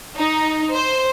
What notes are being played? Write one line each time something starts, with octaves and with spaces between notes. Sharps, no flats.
D#4
C5